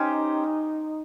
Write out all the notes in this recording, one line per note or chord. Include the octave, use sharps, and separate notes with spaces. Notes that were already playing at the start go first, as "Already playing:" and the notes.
Already playing: C#4 D#4 G4 C5